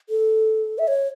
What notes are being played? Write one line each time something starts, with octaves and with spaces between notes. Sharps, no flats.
A4
E5
C#5